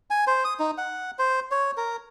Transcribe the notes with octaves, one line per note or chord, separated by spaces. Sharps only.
G#5
C5
D#6
D#4
F#5
C5
C#5
A#4